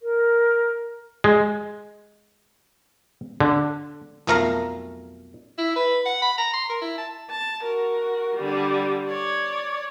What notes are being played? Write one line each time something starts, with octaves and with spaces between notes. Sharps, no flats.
A#4
G#3
D3
B1 F2 A3 A#4 F5 A#5
E4
B4
F#5
B5
A#5
C6
A#4
E4
A5
A5
F#4 A#4
D3 G3
C#5 D5